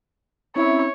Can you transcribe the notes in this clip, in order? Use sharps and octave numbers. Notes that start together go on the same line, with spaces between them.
C4 C#4 E4 C#5 E5